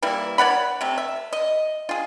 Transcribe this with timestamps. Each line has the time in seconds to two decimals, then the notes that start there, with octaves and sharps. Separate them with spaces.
0.02 E3 G3 A#3 E4
0.38 C#5 D5 F#5 B5
0.81 C3 A3
0.98 E5
1.33 D#5
1.89 F4 G#4